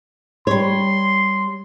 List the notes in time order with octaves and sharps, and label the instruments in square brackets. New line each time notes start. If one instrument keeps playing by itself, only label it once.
[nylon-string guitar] G3 C#5 [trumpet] C6